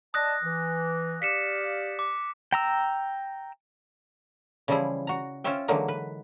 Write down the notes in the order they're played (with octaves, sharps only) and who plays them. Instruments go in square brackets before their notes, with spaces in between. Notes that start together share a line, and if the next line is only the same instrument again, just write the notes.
[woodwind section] D5 D#5 A5 [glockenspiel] D#6 F#6 A#6
[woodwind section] E3
[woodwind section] G4 D5 F5 [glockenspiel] B6 C#7 E7
[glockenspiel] D6
[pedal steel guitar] G5 A#5 E6
[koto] C#3 E3 F3 G3 E4 G#4
F#4 A#5
C#4 F4 C5 C#5 E5 G5
D3 E3 F#3 G#3 A#3 D#4
B4